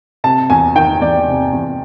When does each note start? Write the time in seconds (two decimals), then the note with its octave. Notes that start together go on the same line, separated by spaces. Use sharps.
0.24 C3 A5
0.50 E2 G#5
0.75 D#3 G5
1.01 E2 D5
1.27 C3
1.53 E2